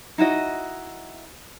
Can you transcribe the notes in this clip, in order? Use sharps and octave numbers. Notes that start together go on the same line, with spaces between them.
D#4 E4 F#4 D#5